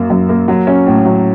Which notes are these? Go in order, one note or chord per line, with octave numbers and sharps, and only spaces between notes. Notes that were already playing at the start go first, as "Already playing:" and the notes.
Already playing: F#2 A#3
F#2
A#3
F#3
C#4
A2
F#3